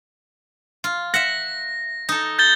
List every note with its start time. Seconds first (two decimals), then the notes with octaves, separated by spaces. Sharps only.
0.84 F4
1.14 E5 F#5 A#6
2.09 D#4 A4
2.39 G6 A6 G7